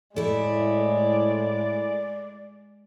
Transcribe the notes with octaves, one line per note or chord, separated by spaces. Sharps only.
A2 G#3 A3 E4 D5